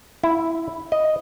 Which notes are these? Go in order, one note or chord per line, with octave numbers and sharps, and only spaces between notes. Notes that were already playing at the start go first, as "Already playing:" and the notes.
E4
D#5